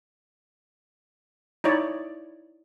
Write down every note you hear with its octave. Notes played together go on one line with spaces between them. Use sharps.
D#4 E4 C#5 D5